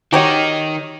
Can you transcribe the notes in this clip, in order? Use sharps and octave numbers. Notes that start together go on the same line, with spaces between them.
D#3 D#4 F#4 G4 C#5